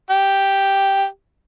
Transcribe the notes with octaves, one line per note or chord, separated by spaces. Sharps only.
G4